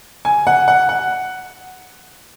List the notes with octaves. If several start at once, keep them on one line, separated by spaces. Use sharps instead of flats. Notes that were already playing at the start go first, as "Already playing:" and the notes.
G#5
F#5
F#5
F#5